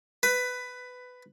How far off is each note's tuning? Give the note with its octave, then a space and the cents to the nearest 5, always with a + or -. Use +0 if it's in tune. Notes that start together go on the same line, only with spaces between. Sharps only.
B4 +15